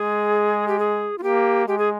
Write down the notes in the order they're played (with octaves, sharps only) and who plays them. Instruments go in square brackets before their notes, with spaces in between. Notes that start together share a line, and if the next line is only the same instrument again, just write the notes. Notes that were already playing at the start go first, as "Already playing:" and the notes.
Already playing: [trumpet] G#3 [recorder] G#4
[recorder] G4
G#4
F4
[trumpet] A#3 [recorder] G4
[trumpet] G#3 [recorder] G4
[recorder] G#4